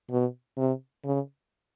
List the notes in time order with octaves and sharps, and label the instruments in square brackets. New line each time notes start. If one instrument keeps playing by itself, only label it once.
[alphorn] B2
C3
C#3